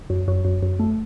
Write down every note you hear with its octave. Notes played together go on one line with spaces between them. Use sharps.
F#2
F#2
F#2
F#2
A3